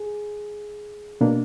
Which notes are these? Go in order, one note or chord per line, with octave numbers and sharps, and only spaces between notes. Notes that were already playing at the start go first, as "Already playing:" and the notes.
Already playing: G#4
B2 A#3 D4